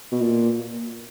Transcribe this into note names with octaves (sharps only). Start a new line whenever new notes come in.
B2
A#2